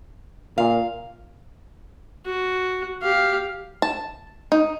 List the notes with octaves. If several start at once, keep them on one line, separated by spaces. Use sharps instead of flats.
A#2 F5
F#4
G4 F5
A5
D#4